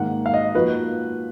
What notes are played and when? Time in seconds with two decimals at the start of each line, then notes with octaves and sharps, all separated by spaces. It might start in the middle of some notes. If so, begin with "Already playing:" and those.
Already playing: G#2 D#3 A#3 F#5
0.26 F5
0.34 D#5
0.54 F3 A#3 D#4 F#4 B4